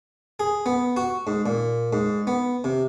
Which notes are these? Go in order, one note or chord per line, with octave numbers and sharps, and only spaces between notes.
G#4
B3
F#4
G#2
A#2
G#2
B3
C3